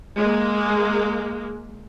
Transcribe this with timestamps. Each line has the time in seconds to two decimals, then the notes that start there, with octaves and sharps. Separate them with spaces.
0.16 G#3 A#3